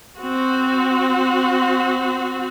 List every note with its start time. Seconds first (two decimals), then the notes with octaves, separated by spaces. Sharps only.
0.20 C4 F#4